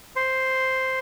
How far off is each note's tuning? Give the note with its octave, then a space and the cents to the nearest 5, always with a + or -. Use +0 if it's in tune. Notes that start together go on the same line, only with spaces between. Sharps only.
C5 +0